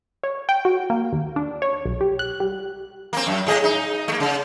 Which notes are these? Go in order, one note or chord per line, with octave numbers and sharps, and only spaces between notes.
C#5
G5
F#4
A#3
D#2
D4
C#5
B1
G4
F#6
G3
A#3 C4
F#2
A2 G#4 D#5
D#4
A3 A#3
C#3